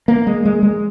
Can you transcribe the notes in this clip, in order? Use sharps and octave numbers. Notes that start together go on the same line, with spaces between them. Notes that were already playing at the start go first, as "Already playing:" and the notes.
A#3
G#3
G#3
G#3